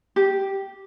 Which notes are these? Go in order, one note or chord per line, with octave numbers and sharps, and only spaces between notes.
G4